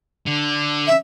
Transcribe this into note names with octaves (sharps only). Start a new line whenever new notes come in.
D3
E5